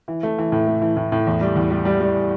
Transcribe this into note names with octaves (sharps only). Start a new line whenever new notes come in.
E3
A3
E3
A2
A3
E3
A2
A2
E2
G3
E2
G3
G3
G3